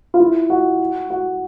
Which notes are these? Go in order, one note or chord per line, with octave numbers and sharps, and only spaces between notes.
F4
E4
F#4
F#4